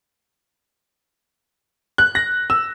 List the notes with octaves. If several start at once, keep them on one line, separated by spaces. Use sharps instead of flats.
F#6
A#6
E6